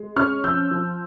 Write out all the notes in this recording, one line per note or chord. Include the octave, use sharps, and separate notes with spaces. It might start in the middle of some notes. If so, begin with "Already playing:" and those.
Already playing: G#3
C#4 C#6 F6
F3 E6 G6
F3